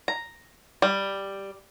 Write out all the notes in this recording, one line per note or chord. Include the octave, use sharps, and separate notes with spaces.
A#5
G3